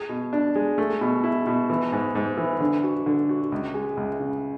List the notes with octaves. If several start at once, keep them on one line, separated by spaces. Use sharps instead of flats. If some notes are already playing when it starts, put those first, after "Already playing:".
Already playing: G#4
B2
D4
G#3
A3
B2
E4
B2
E3
G#2
G#2
E3
D3
F#4
D3
F#4
C#2
G#3
C#2
C#3